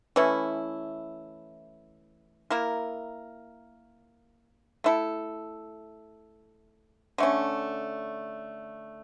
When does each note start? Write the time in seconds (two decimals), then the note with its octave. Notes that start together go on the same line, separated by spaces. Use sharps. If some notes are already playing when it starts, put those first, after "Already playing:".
0.16 E3 A3 C#4 E4
2.50 A#3 E4 A#4
4.84 A3 E4 A4
7.18 D3 A3 C#4